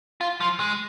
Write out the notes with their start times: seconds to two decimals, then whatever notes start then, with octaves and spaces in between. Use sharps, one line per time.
0.21 F4
0.40 F3
0.60 G#3